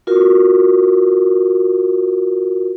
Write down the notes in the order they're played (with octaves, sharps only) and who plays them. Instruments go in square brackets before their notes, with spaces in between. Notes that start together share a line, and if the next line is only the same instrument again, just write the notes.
[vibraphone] F4 F#4 A#4